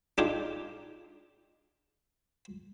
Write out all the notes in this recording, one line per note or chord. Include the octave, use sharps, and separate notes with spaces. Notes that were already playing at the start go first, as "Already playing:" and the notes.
D4 D#4 F4 G4 G#4